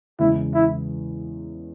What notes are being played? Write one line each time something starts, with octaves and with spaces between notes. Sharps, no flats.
E2 C#3 G#3 C#4 E4
E4